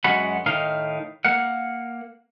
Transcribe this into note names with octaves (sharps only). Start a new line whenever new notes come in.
F#2 G#3 F#4 F#5 B5
A2 D#3 D#4 F5
A#3 F5 F#5